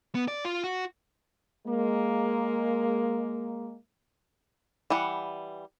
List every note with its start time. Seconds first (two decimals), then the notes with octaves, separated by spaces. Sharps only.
0.15 B3
0.28 D5
0.45 F4
0.64 F#4
1.67 G#3 A#3
4.90 E3 G3 F#5